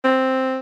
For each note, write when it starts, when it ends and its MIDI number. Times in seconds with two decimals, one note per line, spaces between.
0.04 0.60 60